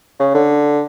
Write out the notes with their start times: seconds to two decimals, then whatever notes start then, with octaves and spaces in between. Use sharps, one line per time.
0.20 C#3
0.35 D3